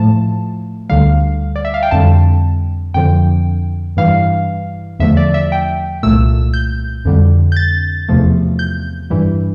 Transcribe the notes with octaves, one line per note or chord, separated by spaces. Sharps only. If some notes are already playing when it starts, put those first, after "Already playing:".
Already playing: A2 F3 A3 A5
D2 D3 G3 F5
D5
E5
F5
G5
F2 D3 G3 A5
F2 D3 F3 G5
G2 E3 G3 F5
E2 D3 F3 A3 E5
D5
E5
G5
C2 A#2 A3 E6
G6
F2 D3 G3
G6
A6
E2 C3 F3 A3
G6
G2 E3 G3